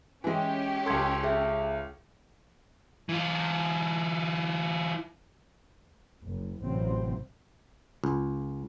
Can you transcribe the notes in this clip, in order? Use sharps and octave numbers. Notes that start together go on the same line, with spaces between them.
E3 G#3 C#4 G4
C#2 A4 G5 C6 G#6
G#4 E5
E3 F4
F#1
A1 C3 F#3 C4
C#2